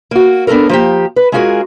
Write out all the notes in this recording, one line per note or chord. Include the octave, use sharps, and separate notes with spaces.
A#3 F#4
B3 D4 F#4 A4 A#4
F3 A#3 G4
B4
G#3 C#4 F4 F#4 G#4 A#4